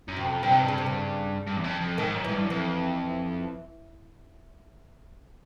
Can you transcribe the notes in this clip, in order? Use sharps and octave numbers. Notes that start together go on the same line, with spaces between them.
F#2
C3
F2
G2 C3
G#2
G2
C#3
C3
C#3
G2
E2
F2
F2
G#2 D#3
F#2
G#2 E3
G2
F#2
F2 E3